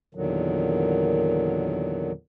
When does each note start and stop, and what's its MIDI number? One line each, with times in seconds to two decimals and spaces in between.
0.15 2.12 40
0.15 2.12 46
0.15 2.12 50
0.15 2.12 51
0.15 2.12 54